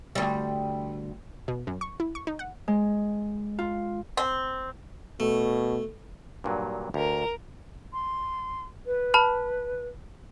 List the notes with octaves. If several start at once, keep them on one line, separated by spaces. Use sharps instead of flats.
D2 G3
B2
F#2
C#6
E4
C#6
D#4
F#5
G#3
F4
C4
B2 A3
G2 A#2 F#3
D2 A#4
C6
B4
A5 B5 F6